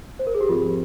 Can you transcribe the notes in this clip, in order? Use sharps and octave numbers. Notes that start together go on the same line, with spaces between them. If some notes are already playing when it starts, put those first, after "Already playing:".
C5
A#4
G#4
G4
G#2 F3 C4 F4